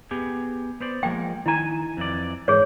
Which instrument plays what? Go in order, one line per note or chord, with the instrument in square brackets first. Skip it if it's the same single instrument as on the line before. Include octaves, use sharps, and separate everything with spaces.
[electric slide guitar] B3 G4 G#4
B3 C5 D5
[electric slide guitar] F3 G#3 A#3 [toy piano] G5
[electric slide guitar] D#3 G#5 [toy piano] E4 A#5
[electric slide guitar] F2 E3 D5
[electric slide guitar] G#2 E3 [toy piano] G#4 C#5